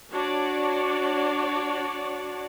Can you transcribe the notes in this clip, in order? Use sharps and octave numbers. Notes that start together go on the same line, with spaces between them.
D4 F#4 C#5 D5